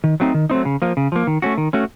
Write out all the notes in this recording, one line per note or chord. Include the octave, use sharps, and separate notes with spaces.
D#3
F#3 A3 C4 D#4
D#3
F#3 A3 C4 D#4
C#3
F3 A#3
C#3
F3 A#3
D#3
A3 C#4 F#4
D#3
A3 C#4 F#4